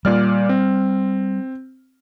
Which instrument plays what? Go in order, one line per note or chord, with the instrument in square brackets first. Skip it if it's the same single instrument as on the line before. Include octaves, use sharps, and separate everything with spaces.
[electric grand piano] A#2 D5 F6 [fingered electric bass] G3
[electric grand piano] C4